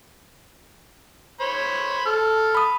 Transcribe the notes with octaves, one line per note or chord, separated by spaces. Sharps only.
C5 C#5 B5
A4 F6
B5 D#6